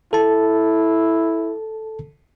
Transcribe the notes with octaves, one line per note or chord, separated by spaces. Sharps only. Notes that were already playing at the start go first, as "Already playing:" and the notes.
E4 A4 A5